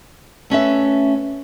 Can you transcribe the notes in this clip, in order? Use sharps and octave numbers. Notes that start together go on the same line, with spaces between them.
A3 C#4 B4 E5